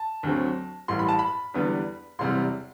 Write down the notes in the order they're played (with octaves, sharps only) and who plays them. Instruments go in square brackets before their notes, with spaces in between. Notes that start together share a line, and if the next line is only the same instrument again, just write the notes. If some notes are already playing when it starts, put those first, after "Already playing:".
Already playing: [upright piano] A5
D2 D3 F#3 C4
A1 A2 G3 C6
B5
A5
B5
E2 D3 G3 B3 D4
E1 E2 C3 G3 C6